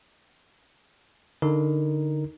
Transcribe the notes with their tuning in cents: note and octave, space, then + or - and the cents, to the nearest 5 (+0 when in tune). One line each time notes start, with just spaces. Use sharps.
D3 +5 D#4 +0 A#4 +0